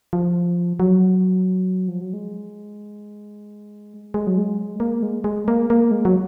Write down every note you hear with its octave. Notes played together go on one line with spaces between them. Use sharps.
F3
F#3
F3
F#3
G#3
G#3
F#3
G#3
A#3
G#3
G#3
A#3
A#3
G#3
F#3